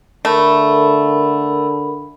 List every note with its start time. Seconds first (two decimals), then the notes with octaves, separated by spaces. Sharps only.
0.25 D3 A3 A#4 B5